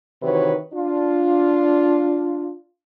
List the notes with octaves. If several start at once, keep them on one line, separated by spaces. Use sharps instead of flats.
C3 D#3 E3 F#4 B4 C#5
D4 F4